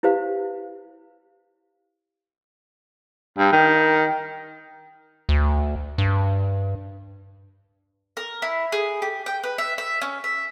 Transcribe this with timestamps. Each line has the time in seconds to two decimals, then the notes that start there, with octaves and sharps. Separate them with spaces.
0.03 E4 G4 B4 C5 F5
3.38 G2
3.52 D#3
5.29 D2
5.98 G2
8.17 A#4
8.42 E4
8.72 G#4
9.02 G4
9.26 G5
9.44 B4
9.58 E5
9.78 E5
10.02 C#4
10.24 E5